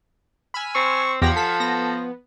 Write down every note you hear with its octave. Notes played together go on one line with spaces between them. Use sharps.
G#5 B5 E6 F6
C4 C#6
E2 F3 G4 F5 F#5 G#6 A#6
A4 B6
B3 A#6